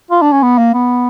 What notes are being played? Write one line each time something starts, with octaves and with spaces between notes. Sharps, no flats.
F4
D4
C#4
B3
A#3
B3